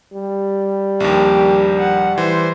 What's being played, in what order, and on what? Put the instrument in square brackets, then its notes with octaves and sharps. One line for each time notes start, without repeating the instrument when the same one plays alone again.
[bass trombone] G3
[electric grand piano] A#1 D#2 [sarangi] G4
[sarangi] F#5
[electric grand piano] E3 [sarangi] C5